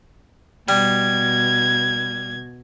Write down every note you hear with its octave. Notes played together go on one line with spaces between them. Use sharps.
B2 G3 G#6